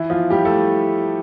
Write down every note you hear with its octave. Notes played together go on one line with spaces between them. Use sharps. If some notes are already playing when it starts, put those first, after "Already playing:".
Already playing: E3 E4
F3 F4
G3 G4
A3 A4